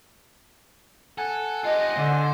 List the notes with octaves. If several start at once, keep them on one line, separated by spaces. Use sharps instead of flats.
A4 F#5 G#5
F4 G4 D#5
D3 C5